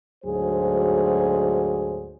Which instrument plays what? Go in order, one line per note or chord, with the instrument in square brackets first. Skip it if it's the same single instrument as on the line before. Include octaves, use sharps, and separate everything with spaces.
[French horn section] D2 G#2 F#3 G#4 C5